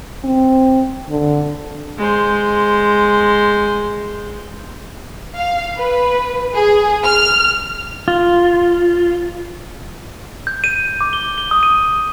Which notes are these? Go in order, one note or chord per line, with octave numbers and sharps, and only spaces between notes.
C4
D3
G#3 C5
F5
B4
G#4
F6
F4
G6
D#7
D6
G7
G7
D#6
D#7